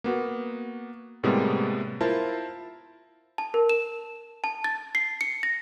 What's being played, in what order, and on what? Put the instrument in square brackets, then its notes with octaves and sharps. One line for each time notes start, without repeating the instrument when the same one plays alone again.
[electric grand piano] A#3 B3 F#4
A2 C3 G3 G#3 A#3 B3
E4 F4 A#4 C5 A5
[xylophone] A5
A#4
E7
A5
A6
C7
C#7
A#6